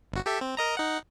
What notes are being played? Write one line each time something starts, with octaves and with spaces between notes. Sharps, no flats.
G1 F#4
G4 A4 E5
C4
A#4 D#5 A#5
D#4 F#5